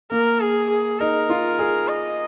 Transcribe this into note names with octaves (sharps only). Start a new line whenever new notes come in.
A#3 A#4
G#4
G#4
D#4 A#4
F4
G#4
D#5